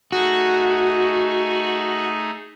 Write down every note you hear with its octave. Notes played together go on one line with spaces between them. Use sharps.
A3 D#4 F#4 G#4